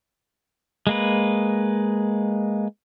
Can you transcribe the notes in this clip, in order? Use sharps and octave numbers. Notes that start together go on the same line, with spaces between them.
G#3 A#3 B4